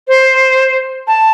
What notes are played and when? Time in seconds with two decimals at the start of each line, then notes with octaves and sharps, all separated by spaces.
0.08 C5
1.08 A5